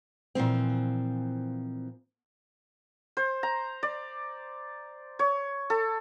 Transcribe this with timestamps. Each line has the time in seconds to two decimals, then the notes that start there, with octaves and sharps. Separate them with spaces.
0.35 A#2 E3 F3 C4
3.17 C5
3.43 A#5
3.83 D5
5.19 C#5
5.70 A4